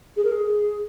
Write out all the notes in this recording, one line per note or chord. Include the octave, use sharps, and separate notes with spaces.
G#4
A#4
G#4